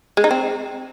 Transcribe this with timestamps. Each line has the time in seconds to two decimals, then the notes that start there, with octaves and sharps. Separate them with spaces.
0.17 G#3
0.24 D#4
0.31 C4